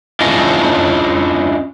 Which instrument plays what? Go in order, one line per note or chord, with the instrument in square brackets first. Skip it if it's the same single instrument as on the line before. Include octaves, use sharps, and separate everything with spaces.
[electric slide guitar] C#4 D4 E4 F4 D#5